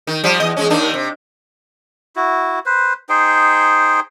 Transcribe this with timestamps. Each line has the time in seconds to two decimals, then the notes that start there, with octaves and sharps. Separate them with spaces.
0.07 D#3
0.24 F3 G3
0.40 E2 D#5
0.57 E2 G#3 C#4
0.70 D#2 D#3 D4
0.94 C3
2.16 E4 F#4
2.66 B4 C5
3.09 D#4 G#4 C5 G5